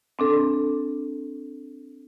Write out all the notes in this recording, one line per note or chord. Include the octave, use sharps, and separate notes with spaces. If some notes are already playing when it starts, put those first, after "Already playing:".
C4 D4 A4